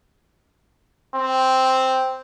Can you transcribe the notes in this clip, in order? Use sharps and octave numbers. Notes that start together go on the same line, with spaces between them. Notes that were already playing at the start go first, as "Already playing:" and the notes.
C4